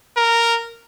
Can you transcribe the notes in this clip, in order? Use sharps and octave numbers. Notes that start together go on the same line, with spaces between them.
A#4